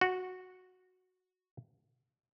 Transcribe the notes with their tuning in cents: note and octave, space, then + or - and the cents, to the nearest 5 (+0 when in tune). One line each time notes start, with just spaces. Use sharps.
F#4 -5